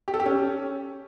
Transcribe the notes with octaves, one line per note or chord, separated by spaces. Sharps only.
G4
A4
G4
C#4